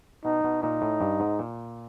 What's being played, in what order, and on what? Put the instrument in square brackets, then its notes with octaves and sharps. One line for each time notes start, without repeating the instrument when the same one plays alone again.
[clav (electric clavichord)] B2 [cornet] D#4
[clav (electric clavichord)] B2
[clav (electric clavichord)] A#2 [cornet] D#4
[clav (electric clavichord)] A2
G2
G#2
A#2